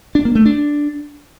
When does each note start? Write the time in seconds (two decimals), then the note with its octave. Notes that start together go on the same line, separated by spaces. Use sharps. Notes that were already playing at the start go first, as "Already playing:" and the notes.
0.15 D4
0.25 A#3
0.35 A3
0.46 D4